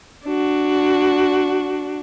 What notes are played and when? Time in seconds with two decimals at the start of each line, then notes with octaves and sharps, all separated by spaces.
0.25 D4 F#4